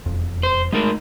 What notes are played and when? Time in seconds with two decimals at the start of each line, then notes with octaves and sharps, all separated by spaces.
0.06 E1 F2
0.43 C5
0.73 G#3 A3 D#4 A#4